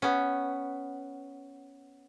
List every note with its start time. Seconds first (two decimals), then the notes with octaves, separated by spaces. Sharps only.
0.02 B3 C#4